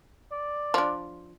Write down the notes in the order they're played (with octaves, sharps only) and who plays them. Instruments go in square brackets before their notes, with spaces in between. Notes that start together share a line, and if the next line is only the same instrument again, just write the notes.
[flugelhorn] D5
[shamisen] F3 D4